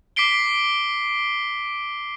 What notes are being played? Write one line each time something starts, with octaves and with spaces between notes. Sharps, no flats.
D6 B6 C7 D7 G7